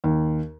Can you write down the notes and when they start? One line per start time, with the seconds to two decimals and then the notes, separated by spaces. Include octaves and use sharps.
0.04 D#2